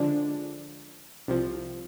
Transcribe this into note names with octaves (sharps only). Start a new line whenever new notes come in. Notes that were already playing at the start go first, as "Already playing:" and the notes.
Already playing: D3 F3 G#3 D4
C2 C3 F3